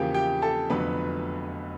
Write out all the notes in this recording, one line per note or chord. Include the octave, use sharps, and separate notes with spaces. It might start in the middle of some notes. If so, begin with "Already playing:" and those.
Already playing: E2 C#3 F3 A#3 G4 G5
G4 G5
A4 A5
F1 F2 D3 F#3 B3 B4 B5